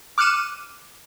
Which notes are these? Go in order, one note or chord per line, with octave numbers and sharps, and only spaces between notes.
D6 F6 F#6 C#7 D#7 E7